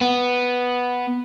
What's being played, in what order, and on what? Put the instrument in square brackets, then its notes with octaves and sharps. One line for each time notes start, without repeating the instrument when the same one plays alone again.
[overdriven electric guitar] B3